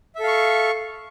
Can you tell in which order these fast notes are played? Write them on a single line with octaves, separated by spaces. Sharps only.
E5 A4 F5 C#6